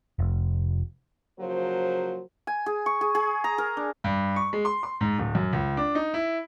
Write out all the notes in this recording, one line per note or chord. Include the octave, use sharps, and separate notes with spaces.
F1
C#3 F3 F#3 A#3 F#4 C5
G#5
G#4
C#6
G#4
G#4
A#5
A#4
D4
G2
C#6
G#3
C6
C6
G#2
D1
F#2
C#2
D4
D#4
E4